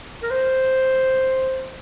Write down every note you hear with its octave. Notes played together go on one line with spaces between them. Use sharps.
A#4
C5